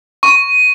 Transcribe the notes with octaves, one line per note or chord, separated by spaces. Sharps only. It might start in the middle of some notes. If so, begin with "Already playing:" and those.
C#6